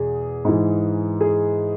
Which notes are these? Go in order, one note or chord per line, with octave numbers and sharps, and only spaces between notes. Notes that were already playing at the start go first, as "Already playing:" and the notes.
Already playing: E2 B2 G#4
G#2 E3
G#4